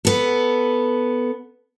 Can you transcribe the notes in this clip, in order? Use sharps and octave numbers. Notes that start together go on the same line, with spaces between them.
B3 A4